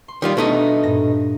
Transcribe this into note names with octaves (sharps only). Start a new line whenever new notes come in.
C6
D#3 G3 F4
B2 A3 D4 D#4 E5
G2 A#2 A#6